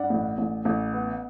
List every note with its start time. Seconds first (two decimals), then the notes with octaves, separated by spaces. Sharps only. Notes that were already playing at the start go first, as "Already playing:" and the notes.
Already playing: G2 D5 F#5
0.10 A1
0.38 A1
0.65 A1
0.93 B3